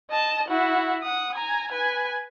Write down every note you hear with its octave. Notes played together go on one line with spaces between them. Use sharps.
D#5 A5
E4 F#4
F#5 D#6
G#5 A#5
B4 G#5